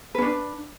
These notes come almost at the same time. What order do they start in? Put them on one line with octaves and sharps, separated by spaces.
B4 C#4 D4